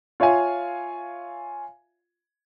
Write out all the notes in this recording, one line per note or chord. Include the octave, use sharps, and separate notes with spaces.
F4 C#5 E5 F5 G#5